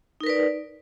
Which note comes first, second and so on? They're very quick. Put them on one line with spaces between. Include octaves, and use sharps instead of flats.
D#4 A#4 B4 D5